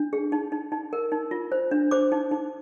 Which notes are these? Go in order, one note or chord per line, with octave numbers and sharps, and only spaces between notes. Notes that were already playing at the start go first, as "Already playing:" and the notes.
Already playing: D4
G#4
D#4
D#4
D#4
A#4
D#4
F4
C5
D4
C5 D6
D#4
D#4